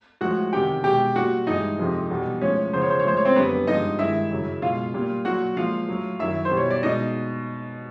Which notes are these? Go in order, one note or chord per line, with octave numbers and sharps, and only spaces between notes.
A2 F3 G#3 F#4 F#5
E2 C3 D#3 G4 G5
B2 G#3 G4 G5
A#2 G3 F#4 F#5
G2 E3 G#3 D#4 D#5
F2 C3 F3 G#3
E2 B2 G3
A2 F3 G#3 C#4 C#5
E2 C#3 F3 C5
C#5
C5
C#5
A2 F3 G#3 C5
C#5
C4 C5
F#2 D3 G3 B3 B4
G2 D3 F3 G#3 D#4 D#5
G2 D#3 G#3 E4 E5
F#2 C#3 F#3
B2 G#3 F4 F5
A#2 G3
A#2 F#3 F#4 F#5
A#2 F3 G#3 F4 F5
A2 F#3
F#2 D#3 F#3 E4 E5
C5
B2 G3
C#5
D5
B2 G#3 D#4 D#5